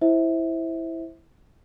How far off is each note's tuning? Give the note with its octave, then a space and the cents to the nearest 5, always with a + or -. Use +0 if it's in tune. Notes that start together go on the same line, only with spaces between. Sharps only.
E4 +0 C5 +5 E5 -20